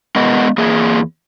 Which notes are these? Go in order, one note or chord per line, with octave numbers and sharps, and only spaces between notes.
G#3 B3 A#4 D#5 F#5
E2 A#3 G#4